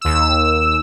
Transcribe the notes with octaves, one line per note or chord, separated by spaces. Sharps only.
D#2 E6